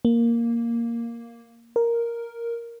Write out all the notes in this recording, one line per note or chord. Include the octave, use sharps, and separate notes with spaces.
A#3
A#4